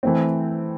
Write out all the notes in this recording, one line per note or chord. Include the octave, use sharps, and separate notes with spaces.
E3 A3 C4